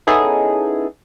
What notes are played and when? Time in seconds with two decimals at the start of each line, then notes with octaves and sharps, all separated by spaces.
0.07 B3 C#4 D#4 E4 G#4 A4